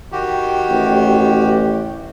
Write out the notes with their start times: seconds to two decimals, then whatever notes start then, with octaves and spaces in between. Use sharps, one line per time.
0.12 D#3 F#4 G4
0.70 A1